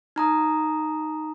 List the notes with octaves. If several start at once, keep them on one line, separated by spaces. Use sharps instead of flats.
D#4 A#5 D#6